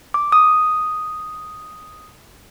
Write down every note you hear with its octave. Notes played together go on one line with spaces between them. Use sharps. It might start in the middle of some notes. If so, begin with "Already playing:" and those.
D6
D#6